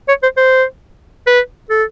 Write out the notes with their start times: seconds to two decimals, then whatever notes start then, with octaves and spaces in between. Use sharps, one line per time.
0.08 C#5
0.23 C5
0.37 C5
1.27 B4
1.70 A4